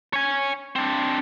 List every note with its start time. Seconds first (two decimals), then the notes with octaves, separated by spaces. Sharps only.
0.13 C#5 G#5
0.76 C4 D4